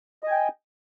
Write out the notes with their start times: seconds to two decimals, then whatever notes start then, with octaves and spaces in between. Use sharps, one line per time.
0.23 D#5
0.27 G#5
0.31 G5